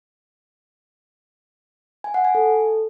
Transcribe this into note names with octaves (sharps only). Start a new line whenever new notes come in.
G#5
F#5
G#5
A4